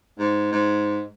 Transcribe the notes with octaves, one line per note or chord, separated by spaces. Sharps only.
G#2
G#2